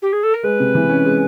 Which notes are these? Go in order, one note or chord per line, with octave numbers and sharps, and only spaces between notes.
G4
G#4
A4
A#4
G#3 B4
C3
E3
C#4
G#3